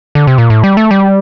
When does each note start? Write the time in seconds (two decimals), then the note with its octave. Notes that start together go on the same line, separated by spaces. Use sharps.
0.15 D3
0.27 C3
0.38 A#2
0.50 A2
0.64 G3
0.77 A3
0.91 G3